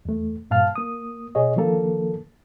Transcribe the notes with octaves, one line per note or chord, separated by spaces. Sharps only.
E2 A3
G2 A#2 F5 A5 F6
A#3 D#6
B2 G#4 C#5 D#5
D3 D#3 F3 A#3 A4